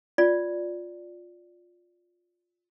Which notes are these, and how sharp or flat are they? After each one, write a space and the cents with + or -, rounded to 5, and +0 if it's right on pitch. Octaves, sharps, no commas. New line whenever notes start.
F4 +15 D5 +0